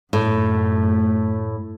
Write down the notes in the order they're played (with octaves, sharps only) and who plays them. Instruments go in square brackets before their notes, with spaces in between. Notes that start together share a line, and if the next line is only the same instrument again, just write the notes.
[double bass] F#2 A3 [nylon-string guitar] A2